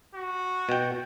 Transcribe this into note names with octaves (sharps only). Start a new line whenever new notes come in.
F#4
B2 G5